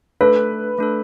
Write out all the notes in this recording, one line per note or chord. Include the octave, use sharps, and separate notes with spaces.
A3 D4 A4 B4
A3 D4 A4